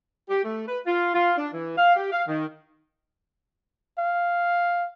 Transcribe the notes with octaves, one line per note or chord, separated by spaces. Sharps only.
G4
A3
B4
F4
F4
D4
E3
F5
G4
F5
D#3
F5